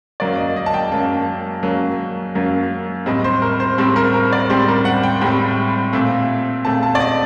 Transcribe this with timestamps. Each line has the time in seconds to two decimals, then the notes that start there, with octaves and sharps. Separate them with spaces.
0.20 F#2 F#3 A#3 D5
0.38 D#5
0.56 D#5
0.66 A5
0.74 G5
0.92 F#2 F#3 A#3 A5
1.63 F#2 F#3 A#3
2.35 F#2 F#3 A#3
3.06 A2 G3 C4 D#5
3.24 C5
3.42 A#4
3.60 C5
3.78 A2 G3 C4 C5
3.96 A#4
4.14 A#4
4.33 D5
4.50 A2 G3 C4 C5
4.68 A#4
4.85 F#5
5.03 G5
5.21 A2 G3 C4 G5
5.93 A#2 A3 C4
6.65 A#2 A3 C4 A5
6.83 A5
6.95 D5
7.00 D#5